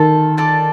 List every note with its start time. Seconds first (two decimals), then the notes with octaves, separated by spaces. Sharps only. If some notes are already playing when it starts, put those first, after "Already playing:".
Already playing: D#3 F4 A4
0.37 F4 A4 D5